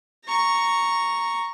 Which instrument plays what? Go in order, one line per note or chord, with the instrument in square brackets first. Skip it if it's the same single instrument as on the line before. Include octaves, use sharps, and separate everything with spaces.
[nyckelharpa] A#5 C#6